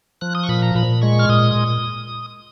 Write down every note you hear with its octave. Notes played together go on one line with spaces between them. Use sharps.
F3 F#6
D#6
C#6
A#2 B5
A#5
A#2 B5
G#3 C#6
F6
A#2 D#6
A#2